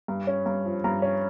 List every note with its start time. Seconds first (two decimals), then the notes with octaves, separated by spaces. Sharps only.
0.08 G2
0.27 C#4
0.46 G2
0.65 F3
0.84 G2 A#5
1.02 C#4